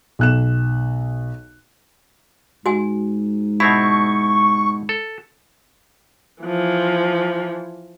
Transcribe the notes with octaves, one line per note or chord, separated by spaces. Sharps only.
B1 F#6 E7
G#2 F#4 G#5
B2 C4 E4 B5 C#6
A4
E3 F3